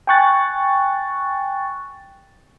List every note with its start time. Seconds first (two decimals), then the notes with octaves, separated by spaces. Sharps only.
0.07 G5 G#5 C#6 F#6 A6